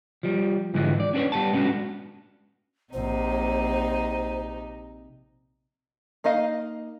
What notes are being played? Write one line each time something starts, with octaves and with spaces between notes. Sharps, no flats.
F3 G3
G#2 D3 E3 F3 G#3
D5
C#4 D4 F#4 B4 C#5
G3 B3 A5
G#3 B3 C#4 D4 F#4
A#1 C3 D#4 C5
A#3 D#4 D#5 F5